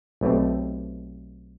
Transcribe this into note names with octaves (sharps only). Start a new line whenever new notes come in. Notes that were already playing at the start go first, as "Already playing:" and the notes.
B1 B2 A3 C4 G4